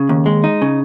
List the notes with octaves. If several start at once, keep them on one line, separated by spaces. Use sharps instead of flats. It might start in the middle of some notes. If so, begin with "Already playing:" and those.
Already playing: C#3
D#2
G#3
D#4
C#3